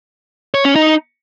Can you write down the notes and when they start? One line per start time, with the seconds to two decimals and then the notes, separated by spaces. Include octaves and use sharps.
0.54 C#5
0.65 C#4
0.76 D#4